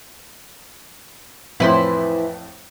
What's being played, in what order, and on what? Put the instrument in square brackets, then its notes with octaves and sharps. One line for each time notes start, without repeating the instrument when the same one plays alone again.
[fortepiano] F2 A2 [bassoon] E3 [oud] E4 B4 C5